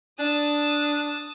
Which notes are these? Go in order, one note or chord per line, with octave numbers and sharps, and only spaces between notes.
D4 A5 D#6